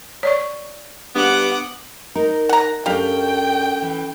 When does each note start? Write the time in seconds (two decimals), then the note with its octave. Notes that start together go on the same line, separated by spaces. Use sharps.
0.23 C#5 D5 C#6
1.15 G2 B3 F#5 D6
2.15 D#4 A#4
2.49 F#5 A#5
2.86 F#2 C#4 D4 G4 A4 F5 G5
3.82 E3